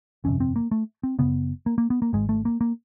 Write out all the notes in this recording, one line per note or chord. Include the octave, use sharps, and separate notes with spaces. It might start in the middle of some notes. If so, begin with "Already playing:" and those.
G1 F2 C3 C#4
C4
A#3
A3
C4
F#1 F2 C#3 B3
A#3
A#3
B3
A#3
G#1 G#2 G#3
A3
A#3
A#3